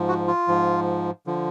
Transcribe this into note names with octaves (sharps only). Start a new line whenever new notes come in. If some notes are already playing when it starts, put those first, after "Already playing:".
Already playing: G#2 F3
F#4
F4
G#2 F3
D3 F3